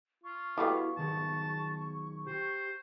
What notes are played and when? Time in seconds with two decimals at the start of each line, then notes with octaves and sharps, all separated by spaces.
0.24 F4 C#6
0.58 G3 A3 B3 E4 F#4 F5
0.97 B1 D#3 G#4 A5
2.27 G4 C5